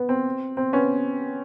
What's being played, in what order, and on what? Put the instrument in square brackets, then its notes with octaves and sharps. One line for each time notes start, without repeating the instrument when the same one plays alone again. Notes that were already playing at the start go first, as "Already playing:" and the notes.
Already playing: [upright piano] B3
C4
C4
B3 C#4